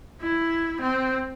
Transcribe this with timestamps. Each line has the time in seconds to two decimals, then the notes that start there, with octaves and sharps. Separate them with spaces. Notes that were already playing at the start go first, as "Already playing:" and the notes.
0.21 E4
0.81 C4